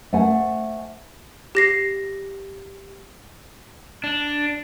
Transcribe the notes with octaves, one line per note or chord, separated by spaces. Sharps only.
A3 C5 F#5 G#5
G4 A#6 C7
D4